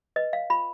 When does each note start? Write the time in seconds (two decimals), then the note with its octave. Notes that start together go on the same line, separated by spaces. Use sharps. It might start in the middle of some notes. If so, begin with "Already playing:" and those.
0.16 B4 D#5
0.33 F5
0.50 F4 B5